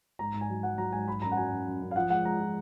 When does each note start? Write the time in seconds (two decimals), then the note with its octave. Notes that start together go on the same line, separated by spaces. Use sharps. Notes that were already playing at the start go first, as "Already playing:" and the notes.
0.19 G#2 A#5
0.34 G#2
0.41 G#5
0.50 F#3
0.63 F#3 F#5
0.78 F#3 A#5
0.93 G#2 G#5
1.07 F#3 B5
1.22 F#2 A#5
1.32 F#5
1.37 F#3 G#5
1.51 F#2
1.67 F#2
1.82 F#2
1.91 F5
1.96 F3 F#5
2.10 G#3 F#5
2.25 G#3 A#5
2.40 F3